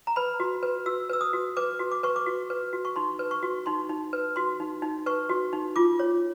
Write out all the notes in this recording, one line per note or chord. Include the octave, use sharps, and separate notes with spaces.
A#5
B4 B5
F#4
B4
F#4 E6
B4 E6
D#6
F#4
B4 D6
F#4
D6
B4 C#6
D6
F#4
B4
F#4
C#6
D#4 C6
B4
C#6
F#4
D#4 C6
D#4
B4
F#4 C6
D#4
D#4
B4 C#6
F#4
D#4
F4 D6
C#5